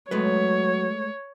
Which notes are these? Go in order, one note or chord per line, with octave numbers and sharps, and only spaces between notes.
F#3 G#3 A3 B4 C#5